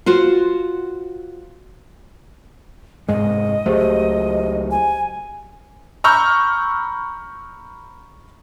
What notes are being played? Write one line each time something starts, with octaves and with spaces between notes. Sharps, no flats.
F4 F#4 C5
F1 G#2 G#3 D#5
C#2 F#3 A3 G4 G#4 C5
G#5
A#5 B5 C#6 E6 F6 G6